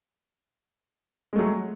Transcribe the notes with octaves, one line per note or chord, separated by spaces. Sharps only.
F#3 G#3 A3